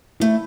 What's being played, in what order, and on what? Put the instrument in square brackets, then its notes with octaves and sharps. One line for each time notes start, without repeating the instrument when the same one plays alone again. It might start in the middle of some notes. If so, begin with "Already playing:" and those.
[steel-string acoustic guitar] A3 [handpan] E4